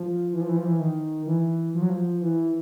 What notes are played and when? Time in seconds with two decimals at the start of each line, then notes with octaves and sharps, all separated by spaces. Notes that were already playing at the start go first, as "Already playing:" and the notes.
Already playing: F3
0.33 E3
0.41 F3
0.49 E3
0.57 F3
0.65 E3
0.80 D#3
1.27 E3
1.74 F3
1.82 F#3
1.90 F3
2.21 E3